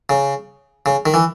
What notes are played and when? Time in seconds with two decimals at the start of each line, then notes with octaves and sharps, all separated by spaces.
0.09 C#3
0.86 C#3
1.06 D#3
1.14 E3